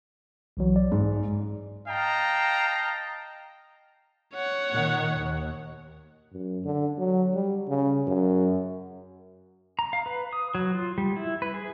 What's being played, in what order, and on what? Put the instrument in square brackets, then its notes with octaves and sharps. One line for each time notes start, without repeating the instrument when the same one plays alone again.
[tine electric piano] B1 E3 F#3
D5
[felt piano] G#2
[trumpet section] D#5 F5 G5 A5 A#5
[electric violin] C#5 F#5
[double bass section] A#2 D#3
D#2
[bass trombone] F#2
D3
F#3
G3
C#3
F#2
[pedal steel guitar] A#5
F5
B4
D#6
F#3
F4
G3
E4
B4
G#4